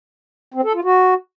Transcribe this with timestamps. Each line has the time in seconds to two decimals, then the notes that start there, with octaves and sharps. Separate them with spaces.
0.54 C4
0.64 A4
0.74 F4
0.84 F#4